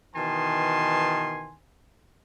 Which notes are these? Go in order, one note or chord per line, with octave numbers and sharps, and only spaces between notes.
B2 D#3 E3 G#5 A5 C6